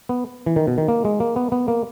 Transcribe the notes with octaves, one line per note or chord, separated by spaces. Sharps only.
B3
E3
D#3
B2
D#3
A#3
G#3
A#3
B3
B3
A#3